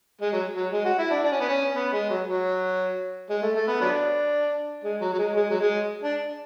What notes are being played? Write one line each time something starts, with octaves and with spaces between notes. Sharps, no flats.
G#3
F#3
F#3
G#3
F#4
E4
D4
D4
C#4
B3
C#4
B3
G#3
F#3
F#3
G#3
A3
A3
B3
F#3 B3 D4
G#3
F#3
F#3
G#3
G#3
F#3
G#3
D4